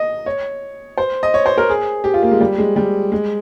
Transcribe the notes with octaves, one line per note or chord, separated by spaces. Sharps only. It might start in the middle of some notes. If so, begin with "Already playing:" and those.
Already playing: D#5
C#5
C5
D#5
C#5
C5
A#4
G#4
G4
F4
A#3
G#3
G3
G#3
G3
G#3